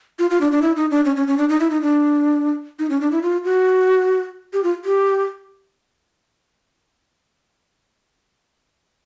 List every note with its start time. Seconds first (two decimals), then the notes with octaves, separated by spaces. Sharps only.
0.19 F4
0.30 F4
0.41 D4
0.52 D4
0.62 E4
0.76 D#4
0.91 D4
1.05 C#4
1.16 C#4
1.27 C#4
1.38 D4
1.49 D#4
1.60 E4
1.70 D#4
1.82 D4
2.79 D#4
2.90 C#4
3.01 D4
3.12 E4
3.22 F4
3.44 F#4
4.53 G4
4.64 F4
4.85 G4